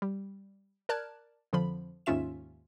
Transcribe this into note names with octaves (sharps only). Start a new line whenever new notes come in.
G3
A#4 D5 A5 F6 F#6 G#6
F2 D3 F3 B5
D#2 G#2 C#4 F4 E5 E7